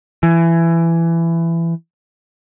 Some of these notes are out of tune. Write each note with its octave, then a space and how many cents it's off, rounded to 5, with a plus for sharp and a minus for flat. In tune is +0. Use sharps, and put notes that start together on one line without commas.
E3 +20